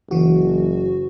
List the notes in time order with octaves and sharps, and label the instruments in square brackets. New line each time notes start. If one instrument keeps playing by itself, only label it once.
[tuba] F#1 [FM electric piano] E3 F#4